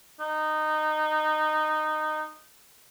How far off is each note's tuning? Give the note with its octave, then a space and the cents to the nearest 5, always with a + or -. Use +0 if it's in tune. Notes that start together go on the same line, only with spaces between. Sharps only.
D#4 -15